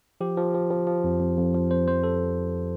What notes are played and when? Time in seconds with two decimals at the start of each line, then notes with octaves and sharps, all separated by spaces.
0.21 F3 G4
0.37 F3
0.55 F3
0.70 F3
0.87 F3
1.04 F2
1.20 F2
1.37 F2
1.54 F3
1.70 F2 C5
1.87 F2 C5
2.04 A4